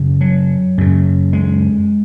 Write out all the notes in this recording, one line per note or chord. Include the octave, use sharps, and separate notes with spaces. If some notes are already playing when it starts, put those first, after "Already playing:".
Already playing: F#2 C#3
F#3
F#2 C#3
G#3